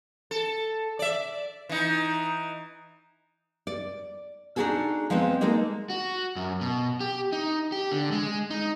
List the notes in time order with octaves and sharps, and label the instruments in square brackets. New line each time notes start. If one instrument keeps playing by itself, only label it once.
[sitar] A4
D5 E5
E3 D#4
[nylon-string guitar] D5
D4 D#4 F4 F#4 G#4 A4
F3 G#3 B3 C4
G#3 A#3 D#4 A4
[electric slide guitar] F#4
F#2
B2
G4
D#4
G4
D3
G#3
D#4